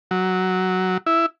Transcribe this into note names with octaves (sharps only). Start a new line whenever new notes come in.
F#3
E4